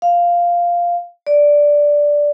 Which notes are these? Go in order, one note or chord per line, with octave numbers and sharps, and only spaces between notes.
F5
D5